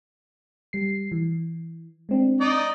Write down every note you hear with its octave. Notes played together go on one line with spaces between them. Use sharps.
G3 C7
E3
G#3 C4 D4
D#4 D5 D#5